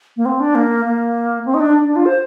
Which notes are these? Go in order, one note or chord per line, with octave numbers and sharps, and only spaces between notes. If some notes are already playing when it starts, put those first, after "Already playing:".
A#3
C4
D4
A#3
A#3
C4
D#4
D4
D4
F4
C5